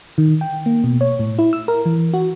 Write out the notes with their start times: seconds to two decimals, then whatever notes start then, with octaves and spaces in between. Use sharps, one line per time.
0.18 D#3
0.41 G5
0.66 A#3
0.84 B2
1.01 C#5
1.19 A2
1.39 E4
1.53 E6
1.68 A#4
1.86 E3
2.13 F#4